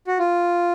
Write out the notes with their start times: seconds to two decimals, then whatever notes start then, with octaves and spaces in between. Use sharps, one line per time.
0.07 F#4
0.19 F4